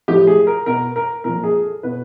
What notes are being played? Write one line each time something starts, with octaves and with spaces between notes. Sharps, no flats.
A2 F3 G4
G#4
A#4
B2 A#4
A#4
A#2 F3 A#4
G#4
A4
B2 B4